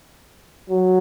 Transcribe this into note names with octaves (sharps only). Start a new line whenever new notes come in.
F#3